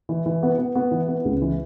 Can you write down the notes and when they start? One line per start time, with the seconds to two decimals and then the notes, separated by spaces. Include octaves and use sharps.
0.09 E3
0.26 E3
0.43 B3
0.58 B3
0.75 B3
0.91 E3
1.08 B3
1.25 C#2
1.42 E3